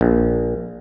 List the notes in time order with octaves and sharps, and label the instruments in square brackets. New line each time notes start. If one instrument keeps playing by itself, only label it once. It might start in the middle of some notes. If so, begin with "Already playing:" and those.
[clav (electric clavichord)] A#1